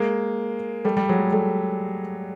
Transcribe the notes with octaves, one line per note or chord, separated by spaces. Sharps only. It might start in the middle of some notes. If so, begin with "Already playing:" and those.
Already playing: G#3 A#3
G3 A3
G3
F#3 G#3
G3 A3